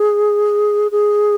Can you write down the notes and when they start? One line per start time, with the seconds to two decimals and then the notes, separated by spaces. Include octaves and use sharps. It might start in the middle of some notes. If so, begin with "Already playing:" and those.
Already playing: G#4
0.91 G#4